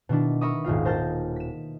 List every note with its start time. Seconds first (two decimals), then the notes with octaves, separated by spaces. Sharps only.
0.09 B2 D#3 D4 E4
0.41 A#4 E5 A#5 B5 C#6 D#6
0.64 D#1 G#1 F4 F5
0.85 A#4 C5 A5 F6 G6 A6
1.36 B6 E7